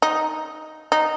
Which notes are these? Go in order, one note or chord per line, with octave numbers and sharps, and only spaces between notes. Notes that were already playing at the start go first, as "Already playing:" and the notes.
D#4
D#4